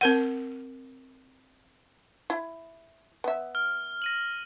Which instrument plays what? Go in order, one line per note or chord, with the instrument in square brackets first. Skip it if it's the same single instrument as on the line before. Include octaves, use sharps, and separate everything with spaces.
[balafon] C4 A#4 F#5
[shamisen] E4
B3 E5
[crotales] F6
A#6 D#7 F#7